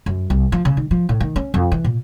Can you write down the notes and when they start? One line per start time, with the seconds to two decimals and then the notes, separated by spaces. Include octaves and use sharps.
0.06 F#2
0.30 C2
0.52 F3
0.65 C#3
0.77 D#3
0.91 F3
1.09 A2
1.21 D#3
1.36 C#4
1.54 F2
1.72 E3
1.84 A#2